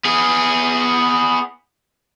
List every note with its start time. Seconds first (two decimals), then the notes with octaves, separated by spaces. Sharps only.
0.05 B3 G#4